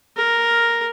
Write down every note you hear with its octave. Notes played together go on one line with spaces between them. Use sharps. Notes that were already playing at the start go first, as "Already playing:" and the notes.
A#4